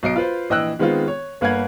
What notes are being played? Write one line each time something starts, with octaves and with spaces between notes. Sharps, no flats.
B1 D#5 C7 D7
F4 B4 C5
A#1 E3 D#5 G5 E6 F#6
D#3 G#3 B3 C4 F4
C#5
G1 A#3 B4 F5 F#5 G#6